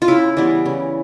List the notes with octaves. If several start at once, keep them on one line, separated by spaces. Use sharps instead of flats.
F4
C#3 E4
E3 G3 B3
C#3